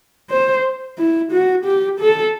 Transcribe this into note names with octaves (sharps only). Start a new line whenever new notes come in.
C5
E4
F#4
G4
A4